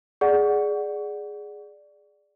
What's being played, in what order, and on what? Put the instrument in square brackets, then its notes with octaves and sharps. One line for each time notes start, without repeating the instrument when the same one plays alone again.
[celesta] G#4 D5 F#5